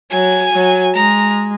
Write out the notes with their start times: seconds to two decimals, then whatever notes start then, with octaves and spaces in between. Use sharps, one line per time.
0.11 F#3 G#5
0.53 F#3
0.95 G#3 A#5